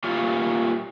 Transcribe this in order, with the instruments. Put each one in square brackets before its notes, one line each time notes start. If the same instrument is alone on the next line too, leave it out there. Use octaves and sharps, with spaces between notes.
[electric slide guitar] A#2 G3 A3 F4 C#5